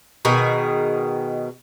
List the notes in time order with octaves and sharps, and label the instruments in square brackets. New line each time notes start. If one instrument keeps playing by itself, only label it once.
[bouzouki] B2 D#3 G#4